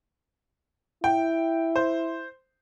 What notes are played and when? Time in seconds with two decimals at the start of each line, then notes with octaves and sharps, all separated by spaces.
1.04 E4 G5
1.76 C5